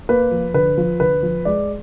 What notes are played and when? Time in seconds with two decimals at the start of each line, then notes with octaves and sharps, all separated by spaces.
0.09 A#3 B4
0.31 F3
0.54 D3 B4
0.78 F3
1.00 D3 B4
1.23 F3
1.45 G#3 D5